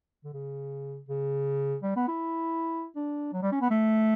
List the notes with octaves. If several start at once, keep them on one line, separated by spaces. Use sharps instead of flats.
D3
C#3
C#3
G3
B3
E4
D4
F#3
G3
C#4
B3
A3